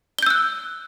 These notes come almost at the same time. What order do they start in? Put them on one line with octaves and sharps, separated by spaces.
G7 G6 E6 F#6